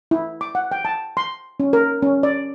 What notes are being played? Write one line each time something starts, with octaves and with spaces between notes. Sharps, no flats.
E4
D6
F#5
G5
A5
C6
C#4
A#4
C#4
D5